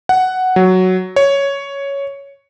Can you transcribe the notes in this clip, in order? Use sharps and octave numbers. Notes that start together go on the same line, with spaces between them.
F#5
F#3
C#5